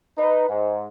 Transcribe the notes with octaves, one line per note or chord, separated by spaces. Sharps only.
D#4 B4
G#2